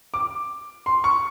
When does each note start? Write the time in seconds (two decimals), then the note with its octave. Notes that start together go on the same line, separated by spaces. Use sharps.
0.14 D6
0.86 C6
1.04 C#6